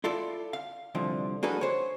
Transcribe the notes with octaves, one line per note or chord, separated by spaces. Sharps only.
E4 F4 A4 D5
F5
C2 D3 F3
A#3 D4 F#4 G#4 A4 B4
C5 C#5